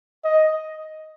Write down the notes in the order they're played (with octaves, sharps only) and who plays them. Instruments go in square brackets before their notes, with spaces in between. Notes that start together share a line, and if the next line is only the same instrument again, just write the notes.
[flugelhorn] D#5